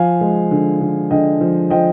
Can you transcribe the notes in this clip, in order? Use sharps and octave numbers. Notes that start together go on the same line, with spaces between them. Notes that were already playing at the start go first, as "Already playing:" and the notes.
Already playing: F3 F5 G#5
G#3
D3
D3
D3 D#5 G5
F3
F3 D#5 G5